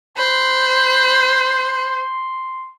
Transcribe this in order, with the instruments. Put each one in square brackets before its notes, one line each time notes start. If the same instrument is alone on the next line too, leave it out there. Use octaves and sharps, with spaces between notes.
[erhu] C5 [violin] B5 F#6 [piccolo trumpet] C6